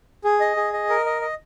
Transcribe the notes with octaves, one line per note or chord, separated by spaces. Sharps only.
G#4
D#5
G#4
D#5
A#4
D#5
D#5